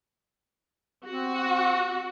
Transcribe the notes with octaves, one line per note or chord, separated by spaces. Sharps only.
C4 F#4